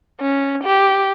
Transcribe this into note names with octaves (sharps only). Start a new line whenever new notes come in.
C#4
G4